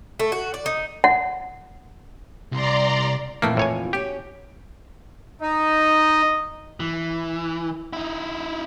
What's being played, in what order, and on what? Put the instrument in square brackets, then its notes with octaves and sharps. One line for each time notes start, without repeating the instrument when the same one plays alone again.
[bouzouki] A3
F#4
D5
D#4
[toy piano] F#5
[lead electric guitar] C2 [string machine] D5 A#5 C6
[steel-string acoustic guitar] F2 A#2 E3 [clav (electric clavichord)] A3 A#3
[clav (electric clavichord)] A2 C#5 G#5
[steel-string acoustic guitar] C#4 F#4 [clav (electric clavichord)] G4
[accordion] D#4 [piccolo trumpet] D#5
[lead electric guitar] E3
D#4 E4